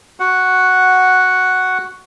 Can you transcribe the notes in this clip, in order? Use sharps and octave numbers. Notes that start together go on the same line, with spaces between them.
F#4 F#5